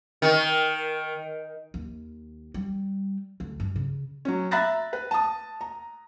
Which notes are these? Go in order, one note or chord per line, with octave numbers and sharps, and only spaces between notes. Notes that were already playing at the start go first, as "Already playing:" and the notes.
D#3
D#2
G3
D2
G2
C#3
F#3 C#4
E5 A#5 B5 F#6 A6 A#6
B4
A5 D#6
A#5